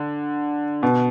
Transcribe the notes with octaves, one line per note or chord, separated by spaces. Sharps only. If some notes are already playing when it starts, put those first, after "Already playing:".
Already playing: D3
B2